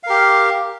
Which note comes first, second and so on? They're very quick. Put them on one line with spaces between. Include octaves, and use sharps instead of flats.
F5 A#4 G4